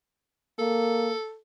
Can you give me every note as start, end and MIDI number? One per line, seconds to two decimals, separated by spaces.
0.59 1.13 58
0.59 1.37 69